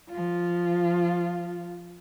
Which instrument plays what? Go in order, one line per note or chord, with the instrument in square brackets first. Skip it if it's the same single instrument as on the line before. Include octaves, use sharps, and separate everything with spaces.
[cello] F3 F4